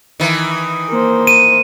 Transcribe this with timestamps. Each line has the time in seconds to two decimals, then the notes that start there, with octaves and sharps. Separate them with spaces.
0.20 D#3 E3
0.89 A#3 C5
1.27 D#7